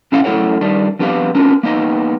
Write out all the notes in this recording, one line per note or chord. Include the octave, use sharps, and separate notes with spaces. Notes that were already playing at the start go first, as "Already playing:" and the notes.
A#2 D3 C#4 E4 F5 F#5
F#2 A3 E4 A#4 C#5 F#5
D#3 G3 D4
F2 B3 D4 G4 B4 F5
B3 C#4 D4 F4 A#4
A#3 B3 D#4 D#5